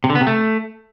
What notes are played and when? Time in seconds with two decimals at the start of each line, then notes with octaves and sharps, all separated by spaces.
0.04 C3
0.10 D3
0.15 B3
0.21 C3
0.27 A3